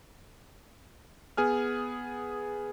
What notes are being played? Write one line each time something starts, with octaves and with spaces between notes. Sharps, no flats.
B3 G#4 G#5 F6